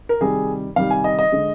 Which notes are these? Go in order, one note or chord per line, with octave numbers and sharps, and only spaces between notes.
A#4
C3 D#3 G3 G#4
C3 D#3 G3 F5
G#5
D#5
D#5
D3 G#3